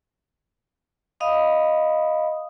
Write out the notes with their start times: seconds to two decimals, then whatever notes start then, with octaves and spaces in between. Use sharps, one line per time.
1.20 D#5 F5 B5 D#6